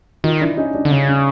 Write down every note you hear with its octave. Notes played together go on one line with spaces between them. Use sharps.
D#3 D#4 F4
D4 E4
C#4 D#4
D4
D3
C#3 C#4
C#4